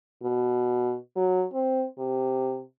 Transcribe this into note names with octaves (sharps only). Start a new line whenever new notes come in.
B2
F#3
C4
C3